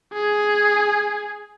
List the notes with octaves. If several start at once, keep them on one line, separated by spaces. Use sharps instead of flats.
G#4